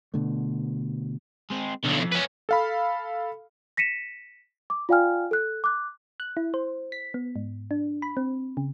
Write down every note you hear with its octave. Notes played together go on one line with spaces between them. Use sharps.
B2 D3 A3
G#3 C4
B1 A2 D3
F2
C#4 B4
A4 F5 B5
A#6 B6 C#7 D#7 E7
D6
F4 D5 F5 G5 G#5 F6
A4 F#6
D6 F#6
F#6
E4
C5
B6
B3
G#2
D4
B5
C4
C#3